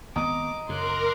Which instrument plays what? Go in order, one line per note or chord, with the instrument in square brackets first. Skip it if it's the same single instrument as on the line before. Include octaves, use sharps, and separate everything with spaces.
[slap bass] G#1 B3 [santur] D#5 A#5 [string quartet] D6
[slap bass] F#2 C#3 [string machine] A#4 [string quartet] C6 D6 F#6